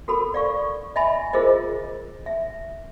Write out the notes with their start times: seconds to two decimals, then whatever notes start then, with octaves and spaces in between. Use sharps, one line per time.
0.08 F#4 A4 A#4 B5
0.34 D5 F5 C#6
0.96 D#5 E5 G#5 B5
1.33 F4 G#4 A#4 C5 D#5
2.26 E5